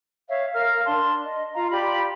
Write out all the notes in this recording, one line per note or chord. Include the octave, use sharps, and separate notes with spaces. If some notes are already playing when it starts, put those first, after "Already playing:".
C#5 E5 F5
A#4 F5 F6
D4 A5 C6
D#5
F4 F5 A#5
F4 G4 D5 B5